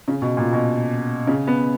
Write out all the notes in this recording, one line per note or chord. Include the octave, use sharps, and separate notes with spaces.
C#3
B2
A#2
B2
C#3
B3